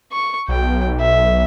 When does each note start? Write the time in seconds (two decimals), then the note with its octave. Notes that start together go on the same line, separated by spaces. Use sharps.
0.12 C#6
0.48 B1 G5
1.00 E5